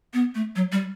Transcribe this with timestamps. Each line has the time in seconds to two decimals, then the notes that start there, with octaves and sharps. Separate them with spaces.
0.14 B3
0.35 A3
0.56 F#3
0.72 G3